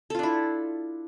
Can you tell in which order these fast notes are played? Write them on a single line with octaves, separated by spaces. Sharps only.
A4 F4 D4 E4